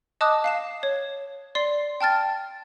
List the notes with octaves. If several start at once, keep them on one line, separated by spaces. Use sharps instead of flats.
D#5 A5 D6 D#6 F#6
F5 C7 E7
C#5
D5 C6 C7
G5 A5 F6 A6